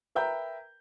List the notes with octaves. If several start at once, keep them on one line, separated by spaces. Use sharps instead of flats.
A#4 B4 E5 G5 A#5 G6